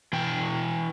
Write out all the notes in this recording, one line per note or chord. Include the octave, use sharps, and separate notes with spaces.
E3 G5